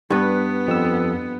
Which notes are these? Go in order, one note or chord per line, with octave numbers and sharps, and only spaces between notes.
G2 B3 B4
F2 E6